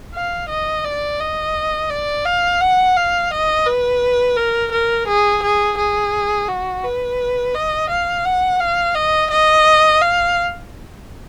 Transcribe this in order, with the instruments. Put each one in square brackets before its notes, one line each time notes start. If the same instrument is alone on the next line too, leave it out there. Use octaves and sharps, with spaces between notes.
[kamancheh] F5
D#5
D5
D#5
D5
F5
F#5
F5
D#5
B4
A#4
A#4
G#4
G#4
G#4
F#4
B4
D#5
F5
F#5
F5
D#5
D#5
F5